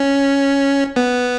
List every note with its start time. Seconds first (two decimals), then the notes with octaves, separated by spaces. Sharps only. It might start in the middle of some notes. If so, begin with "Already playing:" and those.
Already playing: C#4
0.96 B3